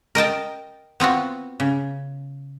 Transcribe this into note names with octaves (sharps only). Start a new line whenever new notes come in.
A#4 D#5 G5 A5
B3 C4 F4 F#4
C#3